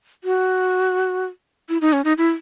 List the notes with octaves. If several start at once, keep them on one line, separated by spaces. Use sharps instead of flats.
F#4
E4
D#4
C#4
D#4
E4